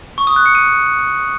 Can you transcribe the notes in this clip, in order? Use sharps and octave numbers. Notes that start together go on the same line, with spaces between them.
C#6
D#6
F#6
C#7
D#7